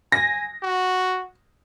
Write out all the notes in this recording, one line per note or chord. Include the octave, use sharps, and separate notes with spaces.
G#5 A#6
F#4